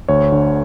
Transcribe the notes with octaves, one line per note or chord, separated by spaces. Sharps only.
D2 C#5
D3